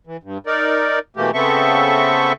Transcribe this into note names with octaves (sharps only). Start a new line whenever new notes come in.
E3
G2
D#4 A#4 D5
B2 E3 A3 A#3 G4
C#3 B3 C4 A4 E5 C#6